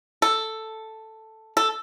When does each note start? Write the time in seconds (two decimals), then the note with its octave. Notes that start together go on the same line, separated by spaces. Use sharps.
0.22 A4
1.57 A4